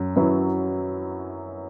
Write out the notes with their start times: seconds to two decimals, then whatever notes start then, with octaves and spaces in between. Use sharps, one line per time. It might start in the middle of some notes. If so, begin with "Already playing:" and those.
Already playing: F#2 F#3
0.16 F#2 F#3 E4 B4